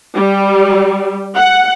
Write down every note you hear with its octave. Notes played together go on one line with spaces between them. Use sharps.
G3
F#5